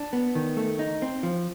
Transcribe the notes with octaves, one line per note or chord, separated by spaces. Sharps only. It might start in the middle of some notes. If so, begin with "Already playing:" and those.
Already playing: D4
B3
D#3
A3
D#4
C4
F3